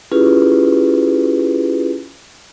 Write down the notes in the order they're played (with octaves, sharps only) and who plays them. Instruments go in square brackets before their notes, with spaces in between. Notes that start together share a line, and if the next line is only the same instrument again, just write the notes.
[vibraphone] C#4 E4 F4 G4 G#4 B4